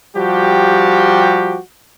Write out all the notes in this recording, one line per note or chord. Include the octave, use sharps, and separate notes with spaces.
F3 G3 F#4 G4